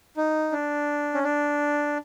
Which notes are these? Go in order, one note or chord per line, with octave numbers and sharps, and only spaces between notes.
D#4
D4
C#4
D4